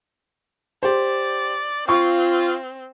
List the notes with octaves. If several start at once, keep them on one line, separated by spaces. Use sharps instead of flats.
G4 C5 D5
C4 F4 C#6